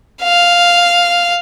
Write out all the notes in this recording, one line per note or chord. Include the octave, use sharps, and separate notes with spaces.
F5